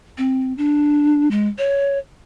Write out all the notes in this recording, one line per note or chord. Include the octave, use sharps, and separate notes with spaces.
C4
D4
G#3
C#5